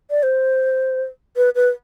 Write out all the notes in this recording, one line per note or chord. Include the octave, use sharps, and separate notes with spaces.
D5
C5
B4
B4